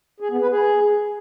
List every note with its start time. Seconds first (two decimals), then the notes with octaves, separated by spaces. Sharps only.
0.20 G#4
0.30 B3
0.41 B4
0.51 G#4